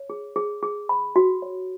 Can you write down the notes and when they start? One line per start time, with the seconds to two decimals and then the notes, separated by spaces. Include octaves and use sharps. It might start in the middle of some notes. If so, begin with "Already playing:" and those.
Already playing: C#5
0.10 G#4
0.36 G#4
0.63 G#4
0.89 B5
1.16 F#4
1.42 C#5